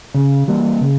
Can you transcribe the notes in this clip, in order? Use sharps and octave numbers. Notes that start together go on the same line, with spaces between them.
C#3
E3 G3 A#3
C#3